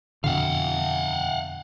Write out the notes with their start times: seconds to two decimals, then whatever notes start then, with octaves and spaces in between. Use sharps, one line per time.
0.24 F2 B2 D3 F5 F#5